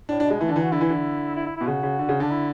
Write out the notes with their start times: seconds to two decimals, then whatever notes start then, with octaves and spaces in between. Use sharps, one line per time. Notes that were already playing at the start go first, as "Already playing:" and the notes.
0.09 A2 D4
0.20 D4
0.25 B2
0.30 G#3
0.40 E3 A3
0.48 D3
0.52 E3 D4
0.62 F#4
0.72 D3 E4
0.81 E3
0.89 D3
1.36 E4
1.46 E4
1.56 B2 E4
1.67 C#3 F#4
1.83 C#3
1.99 D3
2.09 C#3
2.20 D3 D4
2.31 E4